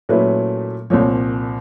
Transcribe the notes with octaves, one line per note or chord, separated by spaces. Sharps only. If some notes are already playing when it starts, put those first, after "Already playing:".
A#2 F#3 A3 C#4 E4 B4
C2 A#2 F3 C#5